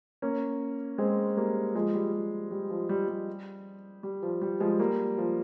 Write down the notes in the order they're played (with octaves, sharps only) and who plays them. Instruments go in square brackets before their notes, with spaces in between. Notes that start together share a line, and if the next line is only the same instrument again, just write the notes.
[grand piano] A#3 C#4
G#3 C4
G3 A#3
F3 G#3
G3
G3
G3
F3
G3
G3
G3
F3
G3
F3 G#3
G3 A#3
F3